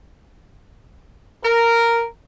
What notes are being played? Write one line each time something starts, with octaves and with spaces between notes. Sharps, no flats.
A#4